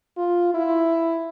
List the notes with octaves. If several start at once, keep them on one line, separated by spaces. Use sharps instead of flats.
F4
E4